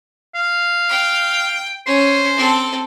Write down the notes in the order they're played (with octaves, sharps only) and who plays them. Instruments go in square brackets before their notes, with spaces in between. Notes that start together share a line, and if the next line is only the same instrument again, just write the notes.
[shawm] F5
[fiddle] G5
[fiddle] C#4 [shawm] C5
[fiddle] C4 A4